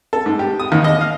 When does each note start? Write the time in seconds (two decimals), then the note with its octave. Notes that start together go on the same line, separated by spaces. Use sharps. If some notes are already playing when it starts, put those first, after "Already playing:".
0.13 A4
0.26 G#2
0.39 G4
0.60 D#6
0.72 D#2
0.84 D#5
1.01 F5